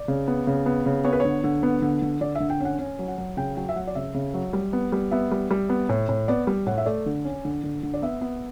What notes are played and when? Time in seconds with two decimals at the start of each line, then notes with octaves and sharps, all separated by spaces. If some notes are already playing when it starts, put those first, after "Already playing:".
Already playing: D5
0.08 C#3
0.27 B3
0.47 C#3
0.66 B3
0.86 C#3
1.04 B3 C#5
1.13 B4
1.20 D3 C#5
1.44 D3
1.63 B3
1.82 D3
2.02 D3
2.21 D3 D5
2.35 D3 E5
2.50 G5
2.60 C#4 F#5
2.79 C#4
2.99 F#3
3.08 F#5
3.18 F#3
3.37 C#3 G5
3.57 F#3 G5
3.69 E5
3.76 F#3 F#5
3.87 D5
3.95 C#3 E5
4.14 C#3
4.34 F#3
4.53 G3
4.73 B3
4.92 G3
5.11 B3 E5
5.32 G3
5.51 G3
5.69 B3
5.89 A2
6.09 A2
6.28 B3 D5
6.47 G3
6.66 A2 F#5
6.78 E5
6.86 A3 D5
7.06 D3
7.25 C#4
7.45 D3
7.64 D3
7.83 D3
7.94 D5
8.02 B3 E5
8.21 B3